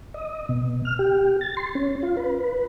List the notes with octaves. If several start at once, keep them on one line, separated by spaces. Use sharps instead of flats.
D#5
B2
F6
G4
A6
C6
C#4
F4
B4
B4